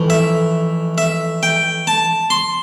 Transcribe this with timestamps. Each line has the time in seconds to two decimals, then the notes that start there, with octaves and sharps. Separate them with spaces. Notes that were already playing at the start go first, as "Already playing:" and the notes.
Already playing: F2 E3 A3
0.10 E5
0.98 E5
1.43 G5
1.87 A5
2.30 C6